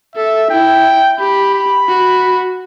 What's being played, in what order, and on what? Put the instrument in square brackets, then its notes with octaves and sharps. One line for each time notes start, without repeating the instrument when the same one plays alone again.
[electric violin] A4 [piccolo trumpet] E5
[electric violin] E4 [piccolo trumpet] G5
[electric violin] G4 [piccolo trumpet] B5
[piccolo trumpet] B5
[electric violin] F#4